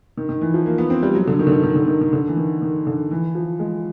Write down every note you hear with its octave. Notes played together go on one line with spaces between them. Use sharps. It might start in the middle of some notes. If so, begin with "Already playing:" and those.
D#3
D#3
E3
F3
A#3
B3
C4
G3
F#3
D3
D#3
D3
D#3
D#3
D3
D#3
D#3
D3
E3
D#3
D#3
D3
E3
F3
G#3